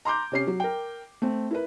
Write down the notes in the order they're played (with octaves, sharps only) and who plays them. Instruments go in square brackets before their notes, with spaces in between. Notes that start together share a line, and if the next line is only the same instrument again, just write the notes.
[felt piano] A#5 C6 D6 G6
C3 C#4 C7
F#3
A#4 G5
A3 C4
E4 A#4 B4